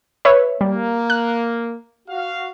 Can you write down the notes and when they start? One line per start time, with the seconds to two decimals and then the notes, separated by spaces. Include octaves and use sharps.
0.25 B4 C#5 E5
0.61 G3 A#3
1.10 F#6
2.08 F#4 F5